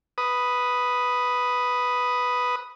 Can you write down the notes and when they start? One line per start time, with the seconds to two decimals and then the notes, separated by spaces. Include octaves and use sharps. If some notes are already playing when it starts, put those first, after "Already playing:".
0.18 B4 D#6